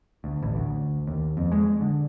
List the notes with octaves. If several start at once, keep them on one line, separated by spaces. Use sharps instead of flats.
D2
A1
D2
D#2
F2
G#3
D3